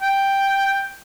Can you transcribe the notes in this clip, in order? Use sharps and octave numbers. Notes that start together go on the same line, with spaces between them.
G5